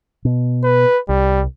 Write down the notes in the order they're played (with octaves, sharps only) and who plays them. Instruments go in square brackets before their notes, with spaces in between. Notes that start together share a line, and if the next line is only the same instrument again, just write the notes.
[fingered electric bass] B2
[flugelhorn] B4
[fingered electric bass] C2 [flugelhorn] G3